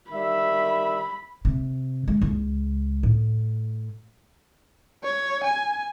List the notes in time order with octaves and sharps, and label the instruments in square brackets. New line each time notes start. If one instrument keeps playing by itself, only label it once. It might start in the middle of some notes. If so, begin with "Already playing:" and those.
[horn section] D#3 G3 E5 [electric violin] B5
[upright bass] C3
G#3
C#2
A2
[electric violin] C#5
G#5